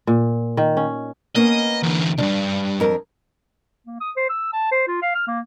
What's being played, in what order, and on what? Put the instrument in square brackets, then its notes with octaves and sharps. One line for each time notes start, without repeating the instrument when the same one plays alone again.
[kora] A#2
D#3
C#4
[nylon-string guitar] A#3 B3 C#4 [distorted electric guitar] D#5
[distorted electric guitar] E2 D3
[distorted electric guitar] C2 G2 [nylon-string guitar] D4
[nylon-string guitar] F2 A#4
[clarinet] A#3
D#6
C5
E6
A5
C5
F4
F5
F6
A#3